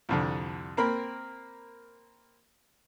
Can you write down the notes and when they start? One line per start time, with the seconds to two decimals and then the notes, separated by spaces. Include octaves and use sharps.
0.09 C2 F2 D3
0.77 A#3 C4 A#4 B5